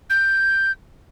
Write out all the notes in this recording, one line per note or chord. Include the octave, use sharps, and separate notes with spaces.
G6